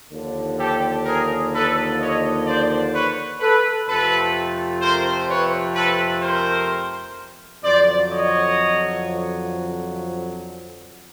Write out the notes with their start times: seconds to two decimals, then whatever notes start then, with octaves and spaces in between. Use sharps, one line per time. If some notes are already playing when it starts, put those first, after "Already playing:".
0.11 D#2 D3 F3
0.59 G4 A4
1.05 G#4 A#4
1.52 A4 B4
1.99 C#5 D#5
2.46 C5 D5
2.93 B4 C#5
3.40 A4 B4
3.87 F2 C3 F3 A3 C4 A4 B4
4.81 A#4 C5
5.28 B4 C#5
5.75 A4 B4
6.22 A#4 C5
7.63 F2 D3 F#3 C5 D5
8.10 C#5 D#5